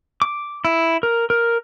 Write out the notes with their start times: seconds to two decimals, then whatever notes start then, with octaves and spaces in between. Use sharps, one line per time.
0.22 D6
0.65 E4
1.03 A#4
1.30 A#4